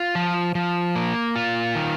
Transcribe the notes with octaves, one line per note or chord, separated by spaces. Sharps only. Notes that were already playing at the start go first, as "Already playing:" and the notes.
Already playing: F4
F3
F3
A#3
F4
D#3